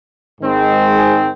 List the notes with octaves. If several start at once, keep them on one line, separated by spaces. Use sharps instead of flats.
G#2 D#3 G#3 C4
G#4